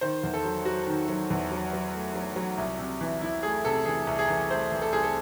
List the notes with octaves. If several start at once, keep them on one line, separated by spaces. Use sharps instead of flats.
D#3 C5
E2
A4
F#3
F#3 F#4
D#3
F#3
E2
F#3
F#3
A3
F#3
F#3
C2
C3
E3
E3 E4
A3 G#4
C3 A4
E3 G#4
C2
G#4
E3
A3 C5
E3
A4
C2 G#4
A4